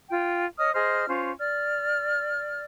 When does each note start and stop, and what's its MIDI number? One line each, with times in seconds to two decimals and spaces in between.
0.10 0.46 65
0.10 0.46 79
0.58 0.71 73
0.58 0.71 75
0.58 0.71 87
0.58 0.71 89
0.74 1.07 68
0.74 1.07 72
0.74 1.07 75
0.74 1.07 89
1.07 1.31 61
1.07 1.31 65
1.07 1.31 72
1.40 2.65 74
1.40 2.65 89